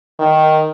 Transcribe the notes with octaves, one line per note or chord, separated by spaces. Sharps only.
D#3